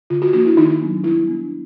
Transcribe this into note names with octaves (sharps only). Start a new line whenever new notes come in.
D3 F4
F#4
F3 A#3 D4 F#4
E4
D#3 D#4
F#3 B3 D4
G3 E4
B3 D4